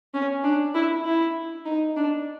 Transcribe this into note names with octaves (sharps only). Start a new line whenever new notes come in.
C#4
D4
E4
E4
D#4
D4